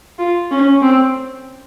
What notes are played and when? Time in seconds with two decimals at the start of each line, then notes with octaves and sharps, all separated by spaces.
0.19 F4
0.51 C#4
0.82 C4